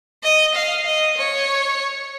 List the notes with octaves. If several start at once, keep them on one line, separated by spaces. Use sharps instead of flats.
D#5
F5
D#5
C#5